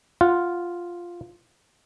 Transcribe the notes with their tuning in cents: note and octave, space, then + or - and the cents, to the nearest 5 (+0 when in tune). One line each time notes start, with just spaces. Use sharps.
F4 +0 F#5 -10